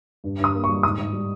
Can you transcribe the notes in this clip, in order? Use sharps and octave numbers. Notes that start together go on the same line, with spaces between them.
G2
G2 D#6
A#3
C#6
G3
G#2 D#6
G#2
G3